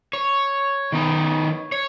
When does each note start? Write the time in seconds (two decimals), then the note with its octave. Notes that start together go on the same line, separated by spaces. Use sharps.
0.13 C#5
0.92 D#3 B3 D#4
1.72 C#5